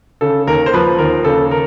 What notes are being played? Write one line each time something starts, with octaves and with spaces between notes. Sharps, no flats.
C#3 A4
D#2 A#4
C5
F3 B4
D#2 A#4
C#3 A4
A#4